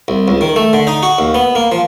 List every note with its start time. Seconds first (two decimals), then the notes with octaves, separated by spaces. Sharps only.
0.08 C2
0.28 C#2
0.41 D#3
0.56 A3
0.73 D3
0.87 D#4
1.03 F#4
1.19 D#2
1.35 B3
1.55 A#3
1.72 F3